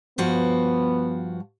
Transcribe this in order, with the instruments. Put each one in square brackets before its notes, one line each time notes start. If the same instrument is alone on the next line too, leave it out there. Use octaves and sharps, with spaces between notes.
[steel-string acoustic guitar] G2 F3 F#4 [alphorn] B3